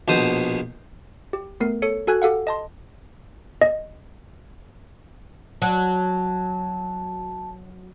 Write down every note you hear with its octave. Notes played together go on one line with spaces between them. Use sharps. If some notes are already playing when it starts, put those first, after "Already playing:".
A#1 B2 C5 D#6
G4
A3 B3 A#4 C7
A4 C#5 C#7
F#4 A4 G#5 F#6 G#6
G4 A4 F5 F#5
D#5 A5 C6
D#5
F#3 A5